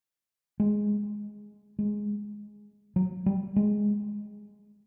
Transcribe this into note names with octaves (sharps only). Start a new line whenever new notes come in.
G#3
G#3
F#3
G3
G#3